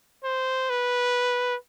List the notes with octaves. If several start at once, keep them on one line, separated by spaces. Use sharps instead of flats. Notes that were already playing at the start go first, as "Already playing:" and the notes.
C5
B4